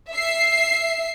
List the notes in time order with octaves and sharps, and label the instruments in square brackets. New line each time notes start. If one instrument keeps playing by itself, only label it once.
[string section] E5 C7